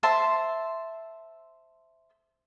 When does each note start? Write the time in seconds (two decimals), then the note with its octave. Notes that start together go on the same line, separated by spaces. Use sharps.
0.03 C5 E5 A5 C6